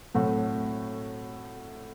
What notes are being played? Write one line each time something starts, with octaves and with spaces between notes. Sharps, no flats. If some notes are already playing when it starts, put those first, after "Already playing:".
A2 F#3 A3 C4 F#4